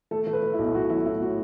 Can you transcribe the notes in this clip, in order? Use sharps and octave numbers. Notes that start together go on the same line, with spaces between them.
A3 A4
A3
B4
A3
E4
B1
B1 F#4
F#3 E4
A2 E4
A2 F#4